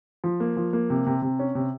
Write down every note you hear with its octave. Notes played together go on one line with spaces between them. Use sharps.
F3
A#3
F3
A#3
C3
C3
C3
C#4
C3